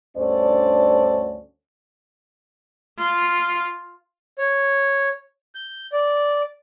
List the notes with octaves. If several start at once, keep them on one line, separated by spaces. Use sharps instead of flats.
D2 G2 C#4 A4 C5 D5
F4
C#5
G6
D5